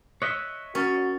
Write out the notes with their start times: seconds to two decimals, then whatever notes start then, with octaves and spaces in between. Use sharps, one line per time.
0.22 C#5 D#5 E5 F#6
0.75 C#4 F#4 A#4 C#6 A6